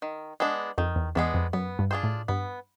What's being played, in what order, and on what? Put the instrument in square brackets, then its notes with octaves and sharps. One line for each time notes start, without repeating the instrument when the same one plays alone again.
[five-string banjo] D#3
G#3 B3 D4
[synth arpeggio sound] F2 [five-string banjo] D#3
[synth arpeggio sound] E2
[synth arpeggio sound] E2 [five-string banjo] G#3 B3 D4
[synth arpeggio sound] F2
[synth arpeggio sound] F#2 [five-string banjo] B3
[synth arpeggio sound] G2
[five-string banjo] D4 F4 G#4 C5
[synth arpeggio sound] A2
[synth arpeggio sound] G2 [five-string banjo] B3